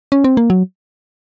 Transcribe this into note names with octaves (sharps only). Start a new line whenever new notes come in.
C#4
C4
A#3
F#3